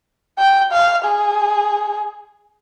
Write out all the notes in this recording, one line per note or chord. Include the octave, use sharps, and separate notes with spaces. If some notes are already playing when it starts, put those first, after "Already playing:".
G5
F5
G#4